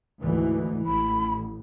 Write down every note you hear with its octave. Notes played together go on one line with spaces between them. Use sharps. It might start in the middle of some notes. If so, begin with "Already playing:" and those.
D2 G#2 E3
A1 B5